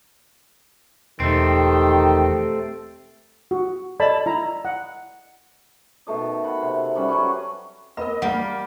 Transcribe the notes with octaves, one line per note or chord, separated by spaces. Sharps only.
E1 D#3 A3 C4 G4
F#4
A4 D5 D#5 A5 B5
E4 A#5
F#5
B2 D#3 A3 D#5
F#5 B5
C3
G3 C#4 F#5 B5
F#3 B4 C#6
B3 A#4 D#5 B5
G3 A#3 A#4 F#5